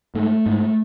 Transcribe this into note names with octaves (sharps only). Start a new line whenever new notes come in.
G#2 A3
G#2